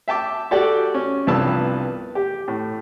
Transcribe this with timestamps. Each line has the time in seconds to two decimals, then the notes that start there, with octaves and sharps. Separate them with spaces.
0.08 E5 G5 A5 D6
0.51 F#4 G4 A4 D5 G5
0.94 C#4
1.27 C2 G2 F3 B3 A5 E6
2.15 G4
2.48 A2